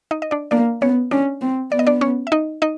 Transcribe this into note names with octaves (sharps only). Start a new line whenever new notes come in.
D#4 D#5
D#5
D4 D5
A#3 D4 D5
B3 C#4 C#5
C#4 D4 D5
C4
B3 D5
D#5
D4 D5
C#4 C#5
E5
D#4 D#5
D#4 D#5